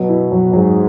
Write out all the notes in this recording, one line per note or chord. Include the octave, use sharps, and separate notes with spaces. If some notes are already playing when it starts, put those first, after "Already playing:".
Already playing: B2 F#3
E4
F#3
G#2 F#3